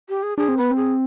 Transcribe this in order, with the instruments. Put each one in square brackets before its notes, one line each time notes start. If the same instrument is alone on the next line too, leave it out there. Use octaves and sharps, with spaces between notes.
[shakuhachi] G4
G#4
[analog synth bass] D4 [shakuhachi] G#4
[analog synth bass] C4
[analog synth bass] B3 [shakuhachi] B4
[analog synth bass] C4
[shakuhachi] G#4